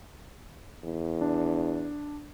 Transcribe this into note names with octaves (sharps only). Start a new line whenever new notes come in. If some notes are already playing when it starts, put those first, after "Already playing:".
E2
D4